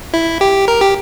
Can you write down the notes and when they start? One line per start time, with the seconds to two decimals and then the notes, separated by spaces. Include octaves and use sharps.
0.14 E4
0.41 G4
0.68 A#4
0.81 G4